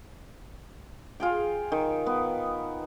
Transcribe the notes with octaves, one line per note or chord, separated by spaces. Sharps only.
F4 G#4 G5
D#3
B3